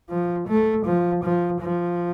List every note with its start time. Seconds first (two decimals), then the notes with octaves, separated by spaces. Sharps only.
0.09 F3
0.47 A3
0.85 F3
1.23 F3
1.61 F3